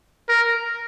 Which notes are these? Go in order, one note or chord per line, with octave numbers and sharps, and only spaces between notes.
A#4